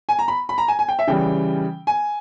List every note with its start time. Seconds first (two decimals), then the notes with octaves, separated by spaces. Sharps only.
0.09 G#5
0.19 A#5
0.28 B5
0.49 B5
0.58 A#5
0.68 G#5
0.79 G#5
0.89 G5
0.99 E5
1.07 C#3 E3 G3 G5
1.87 G#5